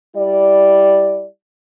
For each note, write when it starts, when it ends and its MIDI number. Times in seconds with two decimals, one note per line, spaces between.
0.16 1.27 55
0.16 1.27 64
0.16 1.27 74